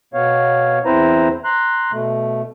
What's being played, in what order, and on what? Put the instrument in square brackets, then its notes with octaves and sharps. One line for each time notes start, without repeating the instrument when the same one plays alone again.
[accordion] B2 B3 C#5 F5
E2 C4 E4 B4 C5 A#5
A#5 C6 F#6
B2 A3